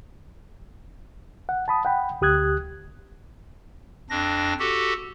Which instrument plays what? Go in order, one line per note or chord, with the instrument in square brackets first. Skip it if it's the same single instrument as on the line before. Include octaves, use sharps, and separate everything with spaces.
[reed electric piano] F#5
A5 B5 D#6
F#5 G5 B5
D2 G4 D#6 F#6 G#6
[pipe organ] F2 D4 A#6
F#4 G4 A4